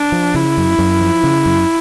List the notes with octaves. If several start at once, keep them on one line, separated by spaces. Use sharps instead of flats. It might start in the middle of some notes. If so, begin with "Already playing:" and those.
Already playing: D4
F3
C#3 E4
F#2
F#2
F3
C#3
F#2